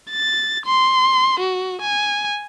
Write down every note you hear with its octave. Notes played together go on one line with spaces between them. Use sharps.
A6
C6
F#4
G#5